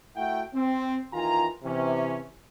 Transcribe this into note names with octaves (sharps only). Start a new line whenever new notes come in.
A3 E4 F#4 F#5 G5
C4
D#2 D#3 E3 F4 G#5 A#5
C3 E3 C#4